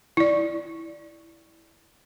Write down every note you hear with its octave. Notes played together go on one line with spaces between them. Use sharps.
E4 D5